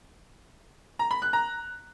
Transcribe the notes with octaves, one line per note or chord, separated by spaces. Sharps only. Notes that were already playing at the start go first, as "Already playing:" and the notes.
A#5
B5
F#6
A#5